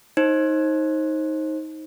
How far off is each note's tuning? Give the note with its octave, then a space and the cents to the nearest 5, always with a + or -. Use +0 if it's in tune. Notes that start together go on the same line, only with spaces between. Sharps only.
D#4 +15 C5 +30